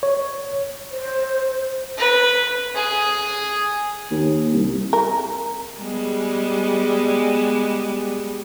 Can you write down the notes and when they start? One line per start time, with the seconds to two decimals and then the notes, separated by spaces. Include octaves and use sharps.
0.03 C#5
0.91 C5
1.98 B4
2.75 G#4
4.11 D#2
4.53 C2
4.93 A#4
5.79 G3 G#3 B3